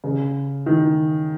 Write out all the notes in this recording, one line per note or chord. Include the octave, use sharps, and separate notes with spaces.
C#3
D#3